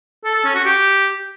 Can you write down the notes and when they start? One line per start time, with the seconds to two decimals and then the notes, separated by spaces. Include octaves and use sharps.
0.24 A4
0.34 A4
0.44 C#4
0.55 F#4
0.65 G4